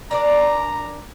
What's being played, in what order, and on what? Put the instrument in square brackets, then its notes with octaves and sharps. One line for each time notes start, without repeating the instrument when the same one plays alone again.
[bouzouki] D4 A#4 D5 [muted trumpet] A#5